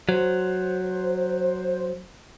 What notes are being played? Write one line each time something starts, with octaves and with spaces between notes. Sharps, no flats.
F#3 C5